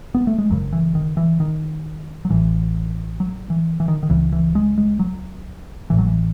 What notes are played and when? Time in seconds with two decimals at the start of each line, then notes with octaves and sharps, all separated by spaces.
0.15 B3
0.27 A3
0.38 G#3
0.50 F#1 F#2 C#3 F#3
0.73 E3
0.95 D#3
1.17 E3
1.40 D#3
2.25 F#3
2.30 A1 A2 E3
3.20 F#3
3.50 E3
3.80 E3
3.88 D#3
4.03 D#3
4.10 C#2 C#3 E3
4.32 E3
4.55 G#3
4.78 G#3
4.99 F#3
5.90 A1 A2 E3
5.98 F#3
6.07 E3